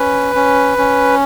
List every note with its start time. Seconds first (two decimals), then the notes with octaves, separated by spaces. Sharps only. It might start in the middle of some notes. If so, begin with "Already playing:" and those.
Already playing: C#4 B4
0.36 C#4
0.78 C#4